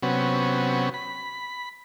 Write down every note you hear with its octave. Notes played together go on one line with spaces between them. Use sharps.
C3 F#3 B3 C#4
B5